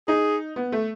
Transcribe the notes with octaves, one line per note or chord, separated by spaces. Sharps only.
D#4 G#4
B3
A3